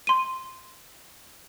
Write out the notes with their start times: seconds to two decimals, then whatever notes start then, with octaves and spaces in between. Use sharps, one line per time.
0.07 C6 D#7